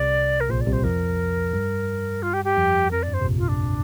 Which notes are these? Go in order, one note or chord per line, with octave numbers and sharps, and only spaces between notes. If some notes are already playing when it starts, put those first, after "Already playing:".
Already playing: C2 C3 D5
A#4
A#1 A#2 C5
D5
C2 C3
C5
F2 F3 A#4
G2 G3
F4
G4
G4
F2 F3
F2 A#4
D5
G2
C5
C3
A#1 A#2
F4
D4